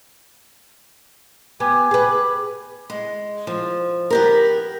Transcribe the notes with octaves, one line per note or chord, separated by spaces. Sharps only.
B3 G4 G#5
G#4 B4
G#3
F3
B3 G4 A#4